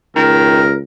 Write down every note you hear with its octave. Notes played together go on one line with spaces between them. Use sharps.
C#2 D#3 A#4